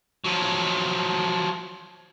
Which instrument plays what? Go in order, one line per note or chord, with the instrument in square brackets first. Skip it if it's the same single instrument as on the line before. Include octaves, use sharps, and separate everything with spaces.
[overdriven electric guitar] F3 F#3